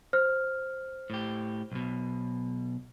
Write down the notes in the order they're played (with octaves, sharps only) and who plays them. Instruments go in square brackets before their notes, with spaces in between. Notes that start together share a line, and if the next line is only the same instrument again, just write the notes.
[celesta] C5 F6
[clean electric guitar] A2 G4
B1 B2